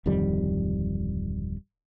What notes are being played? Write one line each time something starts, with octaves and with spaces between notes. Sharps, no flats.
D1 F2 D#3 G3